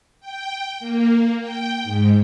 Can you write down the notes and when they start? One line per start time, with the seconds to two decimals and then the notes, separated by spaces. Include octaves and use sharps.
0.20 G5
0.79 A#3
1.40 G5
1.83 G#2